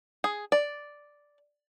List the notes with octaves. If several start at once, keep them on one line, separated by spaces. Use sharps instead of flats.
G#4
D5